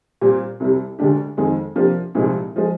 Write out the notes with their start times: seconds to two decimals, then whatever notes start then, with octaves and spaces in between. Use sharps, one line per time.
0.21 A#2 G3 C4
0.60 C2 C3 G3
0.99 D2 D3 G#3 D4 G4
1.37 F2 D#3 G#3 C4
1.76 C3 F3 A#3 D4 G4
2.15 C2 A#2 F3 G#3 D#4
2.56 F3 G#3